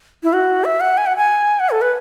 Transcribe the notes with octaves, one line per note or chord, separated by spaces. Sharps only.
E4
F#4
E5
F#5
G#5
F#5
G#5
F#5
A4
B4